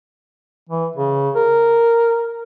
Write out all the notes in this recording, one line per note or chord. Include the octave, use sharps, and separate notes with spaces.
E3
C#3
A#4